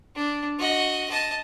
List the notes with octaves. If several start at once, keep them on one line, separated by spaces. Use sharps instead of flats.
D4
F#4 D#5
D#5 A5